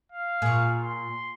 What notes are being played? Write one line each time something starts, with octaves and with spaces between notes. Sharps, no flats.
F5
A#2 G#4 C#6
C6